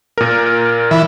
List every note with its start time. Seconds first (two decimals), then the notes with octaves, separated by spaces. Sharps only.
0.18 A#2 A#4
0.91 E3